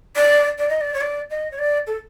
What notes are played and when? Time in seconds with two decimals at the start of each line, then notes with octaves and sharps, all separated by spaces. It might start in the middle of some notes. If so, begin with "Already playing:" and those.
0.16 D5
0.59 D5
0.69 D#5
0.81 D5
0.94 C#5
1.01 D5
1.30 D#5
1.52 C#5
1.59 D5
1.87 A4